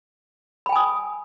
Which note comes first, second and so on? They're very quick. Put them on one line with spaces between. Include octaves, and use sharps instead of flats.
B5 G5 G#5 D#6